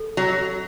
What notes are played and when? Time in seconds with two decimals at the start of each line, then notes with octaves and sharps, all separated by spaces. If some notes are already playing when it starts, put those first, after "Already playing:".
Already playing: A4
0.17 F#3